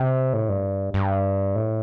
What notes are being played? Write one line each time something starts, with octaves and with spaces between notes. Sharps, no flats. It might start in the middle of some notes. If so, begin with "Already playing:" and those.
Already playing: C3
A2
G2
G2
A2